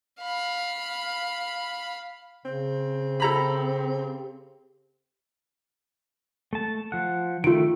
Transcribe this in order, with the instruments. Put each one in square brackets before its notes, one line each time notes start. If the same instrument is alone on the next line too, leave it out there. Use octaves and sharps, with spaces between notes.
[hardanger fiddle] F5 B5
[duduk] C#3 [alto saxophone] C4
[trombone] G4 [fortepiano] A4 A#5 B5
[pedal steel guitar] A3 A5
F3 F#5
[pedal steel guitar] D#3 A3 [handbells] F4 D7